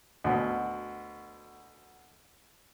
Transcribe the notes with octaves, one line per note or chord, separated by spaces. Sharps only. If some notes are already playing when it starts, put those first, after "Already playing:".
D2 B2